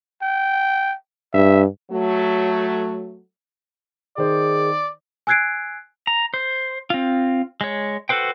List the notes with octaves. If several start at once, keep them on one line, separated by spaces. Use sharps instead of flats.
G5
G2 E5
F#3 A3
D#3 G#4 C5 D5
G#5 E6 F#6 G#6 C7 D7
A#5
C5
C4 F4
G#3 C#5
F#4 A4 B4 C5 G5